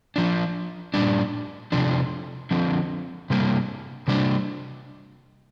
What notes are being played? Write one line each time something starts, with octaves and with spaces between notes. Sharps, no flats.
F3 D4
A#2 G3 D4
C3 F3 D4
D3 F3 C4
C3 G3 A#3
C3 G3 D4